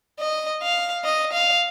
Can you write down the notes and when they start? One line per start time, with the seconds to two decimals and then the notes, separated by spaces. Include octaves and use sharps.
0.19 D#5
0.62 F5
1.05 D#5
1.33 F5